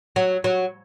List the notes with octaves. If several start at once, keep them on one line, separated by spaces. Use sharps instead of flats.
F#3
F#3